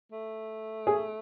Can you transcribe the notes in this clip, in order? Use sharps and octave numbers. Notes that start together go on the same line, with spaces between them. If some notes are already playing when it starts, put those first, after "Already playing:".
A3
G#4